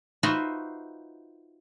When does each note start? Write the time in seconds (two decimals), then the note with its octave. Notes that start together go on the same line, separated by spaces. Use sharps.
0.23 D#4 F4 F#4 B4 C5 E5